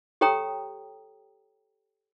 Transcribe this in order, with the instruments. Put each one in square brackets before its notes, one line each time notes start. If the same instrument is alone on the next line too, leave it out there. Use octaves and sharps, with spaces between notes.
[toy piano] G4 A4 C#5 G5 A#5 D#6